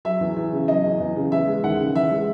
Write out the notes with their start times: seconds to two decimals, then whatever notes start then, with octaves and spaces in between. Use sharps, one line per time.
0.05 F#3 E5
0.21 E2
0.36 E2
0.53 C#3
0.68 F#3 D#5
0.84 E2
1.00 E2
1.16 C#3
1.32 E3 E5
1.48 G#3
1.64 D#2 F#5
1.79 C#3
1.95 E3 E5
2.11 G#3